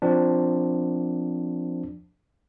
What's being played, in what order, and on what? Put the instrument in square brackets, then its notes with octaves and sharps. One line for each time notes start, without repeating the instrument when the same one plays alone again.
[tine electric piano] F3 C4 D4